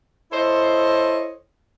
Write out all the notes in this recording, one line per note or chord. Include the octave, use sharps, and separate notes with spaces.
E4 A4 C5 C#5 D#5